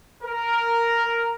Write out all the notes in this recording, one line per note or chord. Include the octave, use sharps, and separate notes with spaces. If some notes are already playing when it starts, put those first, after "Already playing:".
A#4